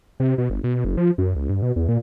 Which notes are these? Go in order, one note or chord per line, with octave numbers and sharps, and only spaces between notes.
C3
B2
G1
B2
F#1
F3
F#2
C#2
G2
B2
E2
A#2